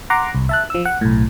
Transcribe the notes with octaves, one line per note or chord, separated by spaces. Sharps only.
F#5 A#5 C6 D6
C2
E5 A5 F#6
F3 E6
F#5
B1 A2